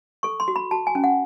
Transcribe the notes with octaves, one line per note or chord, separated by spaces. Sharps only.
A4 C#6
C6
F#4
B5
F#4 A5
G#5
C#4
F#5